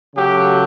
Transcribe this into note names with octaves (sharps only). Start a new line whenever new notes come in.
C#3 F#3 A3 G4